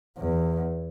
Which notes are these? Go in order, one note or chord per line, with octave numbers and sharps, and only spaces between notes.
E2